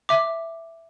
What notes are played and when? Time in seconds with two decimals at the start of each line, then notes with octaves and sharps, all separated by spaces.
0.09 E5 D6